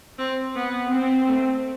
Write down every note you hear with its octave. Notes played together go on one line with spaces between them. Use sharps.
C4
B3
C4
A3